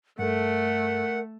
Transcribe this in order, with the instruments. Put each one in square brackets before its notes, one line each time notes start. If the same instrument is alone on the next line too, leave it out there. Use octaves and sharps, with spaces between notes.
[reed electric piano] G2 A4 [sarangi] A3 [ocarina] A#4 [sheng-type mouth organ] F#5